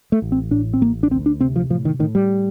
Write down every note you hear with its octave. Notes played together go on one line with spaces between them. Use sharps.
A3
A1
C4
A2 D4
C4
A1 A#3
D4
D2 C4
D4
C3 C4
F3
A2 F3
D#3
A2 D#3
G3